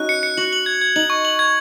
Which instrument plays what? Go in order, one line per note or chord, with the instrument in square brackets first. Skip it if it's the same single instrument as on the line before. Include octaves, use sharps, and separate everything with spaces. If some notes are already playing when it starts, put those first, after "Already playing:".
Already playing: [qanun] C#4 D#4 F#4 [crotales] F#6
[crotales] C#7
C#7
[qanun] F#4 [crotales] F#7
[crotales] F#7
G#6
G#6
[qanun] D#4 [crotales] F#7
[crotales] C#6
F#7
G#6